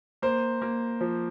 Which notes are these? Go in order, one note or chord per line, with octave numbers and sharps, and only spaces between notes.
A#3 C5
A#3
F3